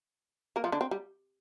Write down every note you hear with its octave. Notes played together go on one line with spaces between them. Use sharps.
A#3 A#4
F3 F4
D3 D4
C4
G3